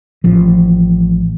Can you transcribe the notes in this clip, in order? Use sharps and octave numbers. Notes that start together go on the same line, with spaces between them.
A1 F3